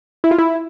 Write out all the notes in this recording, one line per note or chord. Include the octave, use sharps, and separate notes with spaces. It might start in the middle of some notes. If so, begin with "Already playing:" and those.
E4
F4
E4